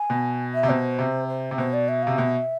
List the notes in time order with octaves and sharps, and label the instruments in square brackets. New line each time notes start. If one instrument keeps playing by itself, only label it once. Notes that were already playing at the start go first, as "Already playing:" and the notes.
Already playing: [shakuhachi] G#5
[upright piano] B2
[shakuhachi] E5
[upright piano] C3
[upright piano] B2 [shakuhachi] C5
[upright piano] C3
[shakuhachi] C5
[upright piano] C3
[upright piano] B2 [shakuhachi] C5
[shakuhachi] D5
E5
[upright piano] C3 [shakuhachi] F5
[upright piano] B2 [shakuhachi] E5